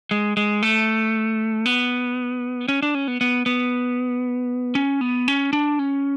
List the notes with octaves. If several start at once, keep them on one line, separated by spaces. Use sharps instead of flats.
G#3
G#3
A3
B3
C#4
D4
C#4
B3
B3
B3
C#4
B3
C#4
D4
C#4